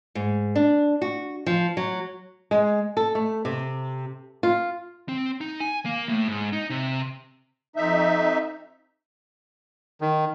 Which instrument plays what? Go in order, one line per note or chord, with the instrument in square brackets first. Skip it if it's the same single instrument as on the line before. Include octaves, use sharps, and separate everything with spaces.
[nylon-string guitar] G#2
D4
F#4
F3
F#3
G#3
A4
A3
C3
F4
[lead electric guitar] C4
D#4
G#5
A#3
A2
G#2
D#4
C3
[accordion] F2 D#4 E5
[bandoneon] D#3